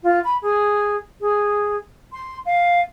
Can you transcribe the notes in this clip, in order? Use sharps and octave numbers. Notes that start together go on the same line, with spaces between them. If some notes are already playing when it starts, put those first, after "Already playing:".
F4
B5
G#4
G#4
C6
F5